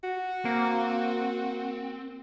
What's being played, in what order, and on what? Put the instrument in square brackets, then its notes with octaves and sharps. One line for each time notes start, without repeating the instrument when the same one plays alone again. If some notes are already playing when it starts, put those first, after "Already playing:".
[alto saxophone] F#4
[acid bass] A#3 [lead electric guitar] C4